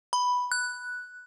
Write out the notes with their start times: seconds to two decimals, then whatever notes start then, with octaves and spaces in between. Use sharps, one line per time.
0.13 B5
0.52 F#6